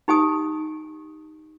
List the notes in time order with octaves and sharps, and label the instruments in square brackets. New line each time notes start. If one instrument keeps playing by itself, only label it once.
[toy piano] D#4 G4 G#5 D#6